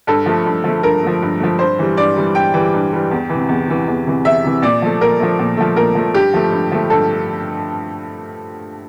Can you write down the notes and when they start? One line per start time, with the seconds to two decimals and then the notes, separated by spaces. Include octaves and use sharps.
0.07 G2 A4
0.26 F3 A3
0.46 G2
0.64 F3 A3
0.83 G2 A#4
1.03 F3 A3
1.22 G2
1.40 F3 A3
1.59 G2 C5
1.79 E3 G3
1.97 G2 D5
2.16 E3 G3
2.35 G2 G5
2.54 E3 G3
2.74 G2
2.93 E3 G3
3.11 E2
3.30 C3 E3
3.49 E2
3.68 C3 E3
3.88 E2
4.06 C3 E3
4.25 E2 E5
4.44 C3 E3
4.62 A#2 D5
4.82 F3 A3
5.01 A#2 A#4
5.20 F3 A3
5.39 A#2
5.57 F3 A3
5.76 A#2 A#4
5.95 F3 A3
6.14 G2 G4
6.34 F3 A3
6.52 G2
6.72 F3 A3
6.90 G2 A4